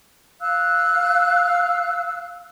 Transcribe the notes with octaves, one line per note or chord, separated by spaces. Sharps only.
F5 E6 F#6